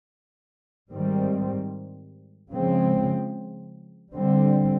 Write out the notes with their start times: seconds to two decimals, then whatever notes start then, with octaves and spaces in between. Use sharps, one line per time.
0.90 G#2 D#3 G3 C4
2.51 C#3 F3 G#3 C4
4.13 D3 G3 C4